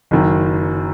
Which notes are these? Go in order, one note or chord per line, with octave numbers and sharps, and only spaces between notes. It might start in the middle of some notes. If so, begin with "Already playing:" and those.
F#1 F#2 D#3